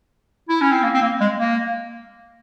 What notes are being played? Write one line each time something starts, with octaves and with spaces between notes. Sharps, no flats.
E4
C#4
C4
A#3
C4
A#3
G#3
A#3